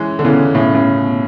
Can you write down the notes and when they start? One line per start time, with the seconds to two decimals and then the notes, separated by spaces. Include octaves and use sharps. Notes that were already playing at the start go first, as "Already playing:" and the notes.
Already playing: E3 G#3 C#4 E4
0.19 D3
0.25 C#3 E3
0.55 A2 C#3
0.75 A2 C#3
0.96 B2